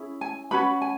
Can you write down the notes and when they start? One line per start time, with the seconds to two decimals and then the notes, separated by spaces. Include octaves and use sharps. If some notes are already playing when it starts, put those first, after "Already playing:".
Already playing: C#4 E4 G#4
0.21 G#5
0.51 C#4 F#4 B4 B5
0.82 G#5